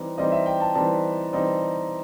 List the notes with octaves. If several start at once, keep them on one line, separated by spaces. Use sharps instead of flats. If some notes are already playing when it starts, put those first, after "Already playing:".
Already playing: E3 G3 C4 D#4
E3 G3 C4 D#4 D#5
E5
G5
A5
E3 G3 C4 D#4 A5
E3 G3 C4 D#4